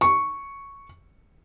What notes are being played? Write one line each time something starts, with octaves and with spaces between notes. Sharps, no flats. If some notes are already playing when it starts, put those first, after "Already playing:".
C#6